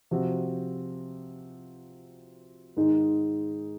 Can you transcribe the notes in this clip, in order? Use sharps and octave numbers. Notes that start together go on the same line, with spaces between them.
C3 F3 C4 F#4
G#2 D#3 G#3 D#4